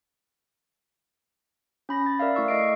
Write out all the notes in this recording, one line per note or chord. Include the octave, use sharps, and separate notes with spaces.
C#4 B5 A#6
A6
A#4 D5 E5 F5
A3 E4 F5 C#6 E6
A3 A4 D#5 C7 D7
D#5